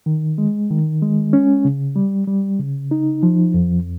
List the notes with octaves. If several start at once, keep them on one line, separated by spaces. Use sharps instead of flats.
D#3
G#3
D#3
G#3
C#4
C#3
G3
G3
C#3
D#4
F3
F2